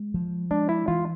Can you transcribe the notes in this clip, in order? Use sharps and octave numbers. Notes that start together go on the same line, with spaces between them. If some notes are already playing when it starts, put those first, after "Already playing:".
Already playing: G#3
F3
G#3 D4
E4
E3 F4